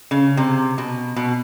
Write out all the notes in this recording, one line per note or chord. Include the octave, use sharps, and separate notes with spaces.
C#3
C3
B2
B2